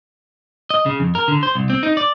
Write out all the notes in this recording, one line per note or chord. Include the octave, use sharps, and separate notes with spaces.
D#5
C#3
F2
A#4
D3
C5
C2
C4
D#4
D5